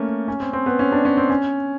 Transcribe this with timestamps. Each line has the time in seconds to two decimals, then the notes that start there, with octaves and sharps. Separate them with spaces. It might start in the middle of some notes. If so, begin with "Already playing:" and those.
Already playing: A3 A#3 C#4
0.28 C#4
0.40 C4
0.53 C4
0.66 B3
0.79 C#4
0.92 D4
1.05 C#4
1.17 C4
1.30 C#4